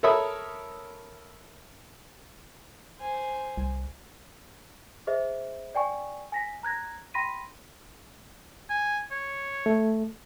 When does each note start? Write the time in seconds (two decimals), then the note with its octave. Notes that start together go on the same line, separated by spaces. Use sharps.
0.03 A4 A#4 C#5 E5 B5 D#6
3.00 C5 G#5
3.57 C2
5.07 G#4 C5 D#5 E5
5.75 D5 G5 G#5 C#6
6.32 G#5 A#6 B6
6.63 A#5 F#6 G#6 A#6
7.14 G5 B5 C6 A#6 B6 D#7
8.69 G#5
9.11 C#5
9.66 A3